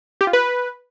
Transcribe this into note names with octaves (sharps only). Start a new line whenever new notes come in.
G4
F4
B4